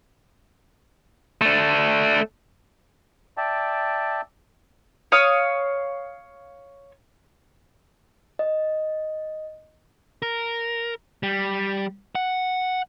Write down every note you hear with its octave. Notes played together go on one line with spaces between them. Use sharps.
A3 D4
D5 E5 G5 A5
C#5 F5 D#6
D#5
A#4
G3
F#5